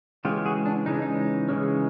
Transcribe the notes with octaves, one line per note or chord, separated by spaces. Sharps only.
C#3 E3 G#3 C#4 F4 G4
F#4 G#4
D4
C#3 E3 G#3 C#4 D#4
D4
D#4
C#3 E3 G#3 C#4